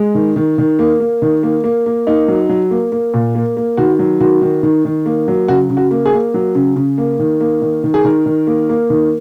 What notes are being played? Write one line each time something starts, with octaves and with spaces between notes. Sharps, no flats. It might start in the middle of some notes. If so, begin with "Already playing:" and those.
Already playing: G#3
D#3
D#3
D#3
A#3
A#3
D#3
A#3
A#3
A#3
A#3 D#4
F#3
F#3
A#3
A#3
A#2
A#3
A#3
D#3 F#4
F#3
D#3 F#4
D#3
D#3
D#3
A#3
F#3
C#3 F#4
C#3
F#4
A#3
G#4
A#3
F#3
C#3
C#3
A#3
D#3
A#3
D#3
D#3
G#4
D#3 A#4
D#3
A#3
A#3
D#3